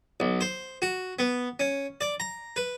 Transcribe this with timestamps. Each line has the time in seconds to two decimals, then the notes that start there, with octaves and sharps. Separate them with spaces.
0.20 B1
0.41 C5
0.82 F#4
1.19 B3
1.60 C#4
2.01 D5
2.20 A#5
2.56 B4